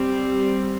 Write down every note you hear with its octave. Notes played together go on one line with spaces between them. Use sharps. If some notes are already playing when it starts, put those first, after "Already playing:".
Already playing: G3 C4